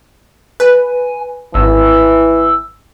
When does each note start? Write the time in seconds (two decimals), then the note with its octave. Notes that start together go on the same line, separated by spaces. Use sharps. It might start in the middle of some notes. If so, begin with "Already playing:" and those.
0.60 B4 G#5
1.54 G#1 E3 E6